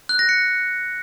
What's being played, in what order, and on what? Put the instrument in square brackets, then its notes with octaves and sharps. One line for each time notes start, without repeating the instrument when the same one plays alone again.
[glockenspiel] F#6
A#6
C#7